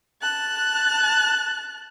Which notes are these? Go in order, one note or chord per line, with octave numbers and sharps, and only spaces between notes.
A5 F#6